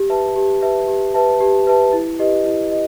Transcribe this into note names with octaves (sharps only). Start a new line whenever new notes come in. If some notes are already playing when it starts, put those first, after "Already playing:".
Already playing: G4
B4 E5 A5
G4
B4 E5 A5
G4
B4 E5 A5
G4
B4 E5 A5
E4
G4 B4 D#5
E4
D#5